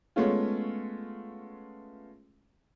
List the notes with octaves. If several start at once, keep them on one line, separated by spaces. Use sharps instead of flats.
G#3 A3 B3 C#4 F4